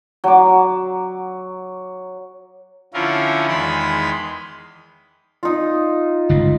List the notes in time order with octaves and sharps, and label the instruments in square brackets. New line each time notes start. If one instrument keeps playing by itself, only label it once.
[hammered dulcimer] F#3 D6
[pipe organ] D3 F3 C#4 E4 F4 A#4
E2 D#3 G#3 D#4 B5 C6
[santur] D#4 F4
[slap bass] G1 C#2 A2